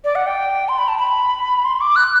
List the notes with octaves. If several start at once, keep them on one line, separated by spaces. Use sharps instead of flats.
D5
F#5
G5
C6
B5
A5
B5
C6
D6
F#6